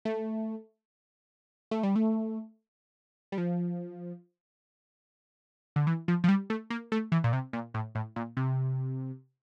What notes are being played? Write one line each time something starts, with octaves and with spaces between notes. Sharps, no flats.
A3
A3
G3
A3
G3
F3
D3
E3
F3
F3
G3
A3
A#3
A3
E3
A#2
C3
A#2
A2
A2
A#2
C3